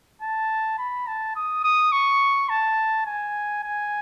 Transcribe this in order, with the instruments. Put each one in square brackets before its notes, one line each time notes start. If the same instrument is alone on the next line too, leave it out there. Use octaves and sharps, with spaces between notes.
[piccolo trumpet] A5
B5
A5
D#6
D#6
C#6
A5
G#5
G#5